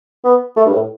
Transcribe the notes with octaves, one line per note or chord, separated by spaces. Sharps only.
B3
A3
G2
A2